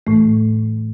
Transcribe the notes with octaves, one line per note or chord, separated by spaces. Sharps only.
A2 E3 A3